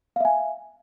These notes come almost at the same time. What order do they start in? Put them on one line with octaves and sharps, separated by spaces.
F5 E5 G#5